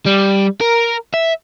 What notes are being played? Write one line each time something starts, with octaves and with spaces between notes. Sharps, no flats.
G3
A#4
E5